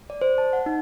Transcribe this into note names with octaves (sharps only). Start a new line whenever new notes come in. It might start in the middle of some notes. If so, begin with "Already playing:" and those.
D5
C5
A5
F#5
D#4